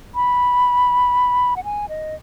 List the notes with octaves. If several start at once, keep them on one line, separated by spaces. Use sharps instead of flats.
B5
F#5
G#5
D#5